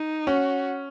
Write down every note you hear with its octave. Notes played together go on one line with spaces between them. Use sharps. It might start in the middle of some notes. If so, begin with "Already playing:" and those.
Already playing: D#4
C#4 F#4